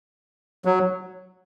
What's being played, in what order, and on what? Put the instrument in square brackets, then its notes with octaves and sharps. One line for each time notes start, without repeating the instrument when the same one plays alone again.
[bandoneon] F#3